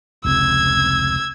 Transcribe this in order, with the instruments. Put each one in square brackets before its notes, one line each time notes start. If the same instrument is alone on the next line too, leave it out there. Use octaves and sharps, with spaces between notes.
[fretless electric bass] F1 C#2 C3 [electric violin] E6 G#6